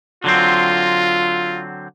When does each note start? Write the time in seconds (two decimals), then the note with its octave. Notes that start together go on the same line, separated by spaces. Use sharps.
0.24 D3 F#3 C4 F4